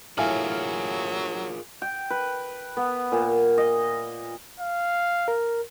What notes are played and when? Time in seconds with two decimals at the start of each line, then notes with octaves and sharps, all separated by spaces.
0.18 A2 F#3 F4 G#4 A#4 F5 G#5 F6
1.82 G5
2.10 B4
2.77 B3
3.12 A#2
3.58 D#5
4.60 F5
5.28 A#4